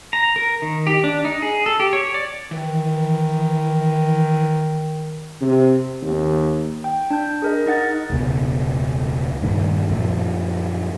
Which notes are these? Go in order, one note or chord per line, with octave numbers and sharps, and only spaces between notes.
A#5
A#4
D#3
G4
D4
D#4
G#4
A4
G4
C#5
D5
D#3 E3
C3
D#2
G5
D4 G6
G#4 A#4 D#5
D#4 D#5 F#5 A6
E1 C#2 B2
G2 A#2 D#3
F#2 A#2 F3